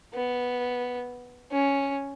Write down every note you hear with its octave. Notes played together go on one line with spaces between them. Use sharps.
B3
C#4